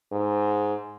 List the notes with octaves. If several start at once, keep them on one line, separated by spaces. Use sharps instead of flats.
G#2